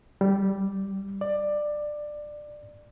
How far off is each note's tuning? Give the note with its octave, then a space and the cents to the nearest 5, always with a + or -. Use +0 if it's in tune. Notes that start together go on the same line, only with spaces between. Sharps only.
G3 -5
D5 +15